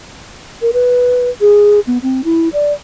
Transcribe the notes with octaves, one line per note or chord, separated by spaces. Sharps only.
A#4
B4
G#4
B3
C4
E4
D5